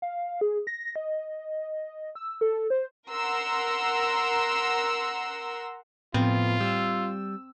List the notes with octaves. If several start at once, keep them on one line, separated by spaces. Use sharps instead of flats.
F5
G#4
A#6
D#5
E6
A4
C5
A#4 F#5 A#5 C6 E6
A2 F3 B3 C4 F4
G3 E6